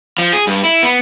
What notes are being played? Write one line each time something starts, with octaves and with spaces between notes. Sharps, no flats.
F3
G#4
G2
E4
B3